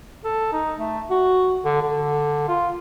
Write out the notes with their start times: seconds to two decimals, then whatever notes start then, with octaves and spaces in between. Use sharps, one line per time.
0.24 A4
0.52 D#4
0.78 A3
1.10 F#4
1.65 D3
1.82 D3
2.48 F4